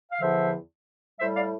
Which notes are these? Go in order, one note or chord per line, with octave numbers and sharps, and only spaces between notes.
F5
E2 D3 F3 C5 E5
A2 G3 C5 E5
D5 F5